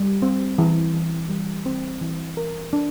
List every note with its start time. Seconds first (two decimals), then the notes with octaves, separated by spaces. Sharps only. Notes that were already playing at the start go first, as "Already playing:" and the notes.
Already playing: G3
0.22 C4
0.58 E3
0.93 E3
1.29 G3
1.66 C4
2.01 E3
2.37 A#4
2.73 D4